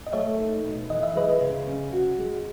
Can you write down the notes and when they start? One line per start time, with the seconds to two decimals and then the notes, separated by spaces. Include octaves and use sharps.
0.07 D#5
0.13 A3 C#5 E5
0.39 D#4
0.65 B2
0.90 E3 D#5
1.03 E5
1.15 G#3 B4 D#5
1.41 C#3
1.67 C#4
1.92 F#4
2.18 G#3